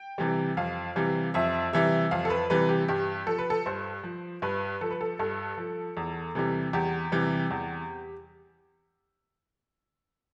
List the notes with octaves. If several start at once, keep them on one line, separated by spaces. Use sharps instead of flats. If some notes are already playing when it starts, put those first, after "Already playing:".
Already playing: G5
C3 E3 G3
F2 F5
C3 E3 G3
F2 E5
C3 E3 G3 E5
F2 F5
A4
B4
C3 E3 G3 B4
G4
G2 G4
F3 A4
B4
A4
G2 C5
F3
G2 B4
F3 A4
B4
A4
G2 A4
F3
E2
C3 E3 G3
E2 G4
C3 E3 G3
E2